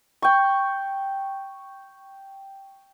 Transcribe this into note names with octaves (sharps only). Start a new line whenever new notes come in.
G5 C#6